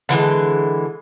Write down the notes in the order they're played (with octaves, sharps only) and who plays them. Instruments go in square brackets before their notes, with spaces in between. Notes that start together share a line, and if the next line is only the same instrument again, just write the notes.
[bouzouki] D3 E3 F3 G#3